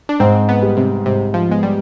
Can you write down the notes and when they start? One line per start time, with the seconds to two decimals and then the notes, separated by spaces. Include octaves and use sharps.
0.09 D4
0.20 G#2 C4
0.49 B3
0.62 G3
0.77 C3
1.06 G#2 C3
1.34 F3
1.49 G#3 B3
1.63 G3